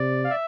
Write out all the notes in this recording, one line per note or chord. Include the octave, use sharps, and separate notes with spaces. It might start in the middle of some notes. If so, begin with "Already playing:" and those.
Already playing: C3 D5
F5
E5